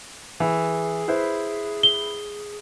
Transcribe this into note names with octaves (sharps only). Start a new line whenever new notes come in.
E3 G#4
E4 B4 C5
G7